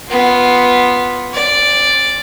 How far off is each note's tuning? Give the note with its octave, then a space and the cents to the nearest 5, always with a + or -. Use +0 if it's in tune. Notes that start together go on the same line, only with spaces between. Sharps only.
B3 +0 F4 +0
C4 +45 D5 +0